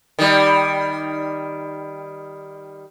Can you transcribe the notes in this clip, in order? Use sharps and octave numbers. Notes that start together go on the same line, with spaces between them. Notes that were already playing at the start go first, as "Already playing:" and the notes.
D#3 G3